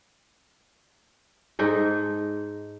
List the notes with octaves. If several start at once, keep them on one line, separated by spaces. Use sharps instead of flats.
G#2 D#4 A4